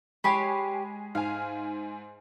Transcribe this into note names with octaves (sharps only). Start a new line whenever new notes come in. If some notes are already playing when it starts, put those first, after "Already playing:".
G#3 G4 C#5 G#5 B5 C7
G#2 F5 G#5